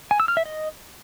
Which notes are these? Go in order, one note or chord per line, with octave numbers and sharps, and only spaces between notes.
G#5
E6
F6
E5
D#5